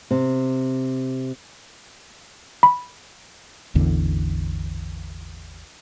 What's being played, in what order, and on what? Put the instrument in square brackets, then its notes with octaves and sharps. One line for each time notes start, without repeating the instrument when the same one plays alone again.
[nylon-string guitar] C3
[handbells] B5
[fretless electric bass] A1 E2 D3